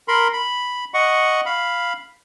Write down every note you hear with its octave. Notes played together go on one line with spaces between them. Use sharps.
A#4 B5 C6
B5
D#5 F#5 C#6
F5 B5